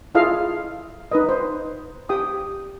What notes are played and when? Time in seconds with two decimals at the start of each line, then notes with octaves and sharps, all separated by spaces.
0.15 E4 F4 G#4 A4 D#5 F5
1.11 D#4 B4 D#5
1.29 C5
2.09 G4 G5 D#6